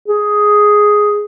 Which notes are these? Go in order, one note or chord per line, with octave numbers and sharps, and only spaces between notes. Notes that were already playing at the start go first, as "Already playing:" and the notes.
G#4